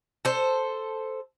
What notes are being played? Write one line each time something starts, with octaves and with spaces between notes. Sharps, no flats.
A4 C5